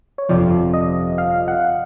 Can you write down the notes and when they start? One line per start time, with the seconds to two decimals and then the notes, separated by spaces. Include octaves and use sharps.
0.18 C#5
0.29 G1 F2 C3 F3 D5
0.74 D#5
1.18 F5
1.48 F#5